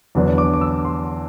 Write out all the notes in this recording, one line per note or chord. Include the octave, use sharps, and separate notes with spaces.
E2 D3 F#3 B3 D4
D6
D6
E6
C6